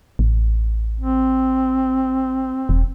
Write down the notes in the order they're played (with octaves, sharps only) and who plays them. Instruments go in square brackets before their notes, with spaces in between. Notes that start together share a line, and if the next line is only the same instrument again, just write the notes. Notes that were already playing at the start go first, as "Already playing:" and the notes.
[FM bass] A1
[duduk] C4
[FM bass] E1